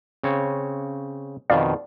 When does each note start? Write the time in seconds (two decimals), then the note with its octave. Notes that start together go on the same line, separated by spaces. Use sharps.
0.23 C#3 C4 C#5
1.50 F2 B2 D#3 D5 F5